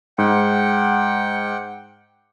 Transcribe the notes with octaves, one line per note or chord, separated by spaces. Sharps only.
G#2 F#5 G5